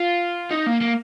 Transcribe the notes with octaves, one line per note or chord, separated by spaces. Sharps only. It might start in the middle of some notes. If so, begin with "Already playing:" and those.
Already playing: F4
D#4
A#3
A#3